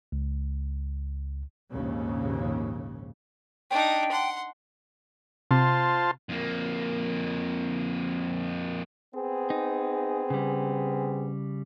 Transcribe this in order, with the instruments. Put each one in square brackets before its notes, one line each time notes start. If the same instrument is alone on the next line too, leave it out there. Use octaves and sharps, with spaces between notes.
[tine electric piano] C#2
[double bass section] A#1 D#2 G#2 C#3
[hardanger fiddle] D4 D#4 [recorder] G5
[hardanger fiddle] F#5 C6
[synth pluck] C3 [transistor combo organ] F4 C5 A5
[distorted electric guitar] F2 A#3
[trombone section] B3 C4 G#4
[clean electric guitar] D#4
C#3 G3